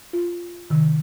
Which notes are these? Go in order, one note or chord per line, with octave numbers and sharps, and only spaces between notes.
F4
C3 D#3